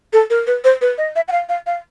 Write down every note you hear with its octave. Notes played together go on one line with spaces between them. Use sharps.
A4
A#4
B4
C5
B4
D#5
E5
F#5
F5
F5
F5